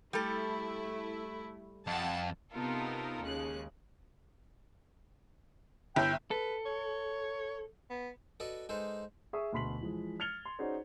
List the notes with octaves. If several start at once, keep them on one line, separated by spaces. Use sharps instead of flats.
G3 A3 E4 A4
F2 F#5 A5
C3 B3 D#4 F4 A4 A#4
D#2 C#3 G#3 F#6
G1 E4 G5
A4 B4
C#5
B3
F#4 A4 B4 D5 D#5
G#3 D#4 A4 B4 C5
G#4 E5 C#6 D#6
D2 B2 B5 C6 B6 F#7
E3 F3 G#3
F6 G#6 A6 C#7 F7 G7
C6
C#4 D#4 F#4 G#4 C5 D5